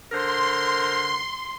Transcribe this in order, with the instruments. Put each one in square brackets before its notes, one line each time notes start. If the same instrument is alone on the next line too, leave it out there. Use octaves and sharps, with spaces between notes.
[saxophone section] D3 A#4 C5 [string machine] C6